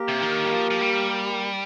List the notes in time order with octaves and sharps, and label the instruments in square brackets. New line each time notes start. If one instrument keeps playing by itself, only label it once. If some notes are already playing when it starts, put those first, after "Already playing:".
Already playing: [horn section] A#3 G4 A#4
[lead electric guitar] C3
D#3
G3
F3
F3
G3